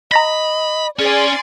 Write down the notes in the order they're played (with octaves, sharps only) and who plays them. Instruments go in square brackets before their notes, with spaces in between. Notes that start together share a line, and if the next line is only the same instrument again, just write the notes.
[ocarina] D#5 [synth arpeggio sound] A#5 A#6 B6 [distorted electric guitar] B5
[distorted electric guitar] C#4 [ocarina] G#4 [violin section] D5 G#5 C6